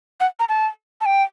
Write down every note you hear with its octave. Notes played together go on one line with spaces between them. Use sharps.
F#5
A#5
A5
A5
G5